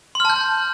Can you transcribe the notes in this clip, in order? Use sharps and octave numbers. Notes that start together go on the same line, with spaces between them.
A5 C6 F6 G6